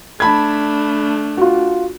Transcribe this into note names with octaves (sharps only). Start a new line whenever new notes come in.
A3 D4 A5 B5 G#6
F4 F#4